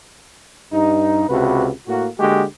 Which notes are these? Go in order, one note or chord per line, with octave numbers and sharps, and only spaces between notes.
G2 D#4
C#2 C3 F#4 B4
A2 A#3 F#4
D3 G#3 A#3 F#4 G4